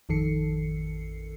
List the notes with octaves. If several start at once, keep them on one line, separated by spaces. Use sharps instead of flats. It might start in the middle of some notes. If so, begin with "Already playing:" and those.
A1 F2 D#3 A4 C7 C#7